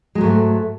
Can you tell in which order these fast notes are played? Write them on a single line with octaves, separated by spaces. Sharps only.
G#3 F#3 G#2 A3